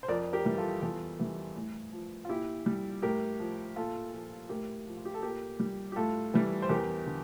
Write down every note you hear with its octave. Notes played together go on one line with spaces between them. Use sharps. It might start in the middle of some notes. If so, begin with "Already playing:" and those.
C5
F2 A#4 D5
G4 A#4
E3 G3
F4 A4
E2 F4 A4
E3 G3
A2
F3
F4
A#2 E4 G4
G3
A2 G4 A#4
F3
A#2 F4 A4
F3
A2 G4 A#4
F3
F4
G4
A4
A#2 G4 A#4
G3
G4
A2 F4 A4
E3 G3
C5
E2 G4 A#4
D3